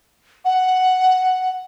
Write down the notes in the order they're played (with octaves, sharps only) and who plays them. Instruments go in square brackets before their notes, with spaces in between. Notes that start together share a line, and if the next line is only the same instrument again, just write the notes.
[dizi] F#5